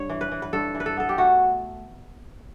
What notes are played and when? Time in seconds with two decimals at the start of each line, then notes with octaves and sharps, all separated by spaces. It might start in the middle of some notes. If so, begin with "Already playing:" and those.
Already playing: G2 C#5
0.10 E3
0.21 B4
0.31 E3
0.42 B4
0.53 G2 A4
0.75 E3
0.80 B4
0.86 A4
0.97 B3 A4
1.09 G4
1.18 A3 F#4